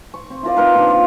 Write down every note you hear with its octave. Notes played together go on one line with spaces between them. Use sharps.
C#6
C4
E4 F4 A#4 D5
C4 D#4 A#4 B4
A#2 D4
F4